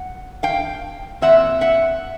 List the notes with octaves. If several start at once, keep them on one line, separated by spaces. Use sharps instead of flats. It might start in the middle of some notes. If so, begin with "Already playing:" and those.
Already playing: F#5
F5 G5
A#2 G3 C4 E5 F#5
E5 F#5